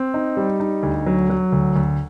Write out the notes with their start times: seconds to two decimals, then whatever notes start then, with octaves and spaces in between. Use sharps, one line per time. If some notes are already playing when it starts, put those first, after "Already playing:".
Already playing: C4
0.14 D#4
0.37 G3
0.60 D#4
0.83 D2
1.06 F#3
1.29 F#3
1.52 D2
1.76 D2